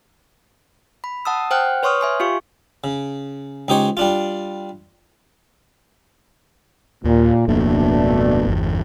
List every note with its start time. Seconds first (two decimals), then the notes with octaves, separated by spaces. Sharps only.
1.04 B5
1.25 F#5 A5 D#6 E6
1.51 C5 F#5 G5 F6 F#6
1.83 B4 C#5 C6 C#6 D#6 F6
2.01 E5 G#5 C6
2.20 F4 G4 F5 C#6
2.84 C#3
3.68 C#2 D#4 G4 C5 C#5
3.97 G3 D4 F4
7.04 D#2 A#2
7.48 D1 F2 B2 A3 A#3 D4
8.47 G1 E2